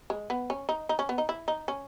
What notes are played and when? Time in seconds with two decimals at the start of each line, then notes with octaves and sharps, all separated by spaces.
0.10 G#3
0.30 B3
0.50 C#4
0.69 D#4
0.89 D#4
0.99 C#4
1.09 B3
1.18 D#4
1.29 E4
1.48 D#4
1.68 C#4